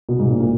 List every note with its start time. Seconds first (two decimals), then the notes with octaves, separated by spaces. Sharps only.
0.09 B2
0.19 G#2
0.29 A#2
0.40 A#2